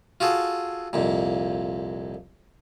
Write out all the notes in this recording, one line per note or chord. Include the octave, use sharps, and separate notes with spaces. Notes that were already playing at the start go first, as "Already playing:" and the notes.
F4 F#4 G#4 A4
C2 F2 A#2